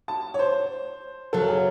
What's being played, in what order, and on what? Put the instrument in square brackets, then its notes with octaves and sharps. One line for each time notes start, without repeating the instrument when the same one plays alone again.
[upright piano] A5
C#5
C5
[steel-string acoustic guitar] F#2 C#3 F#3 [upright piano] A4
[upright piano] G#4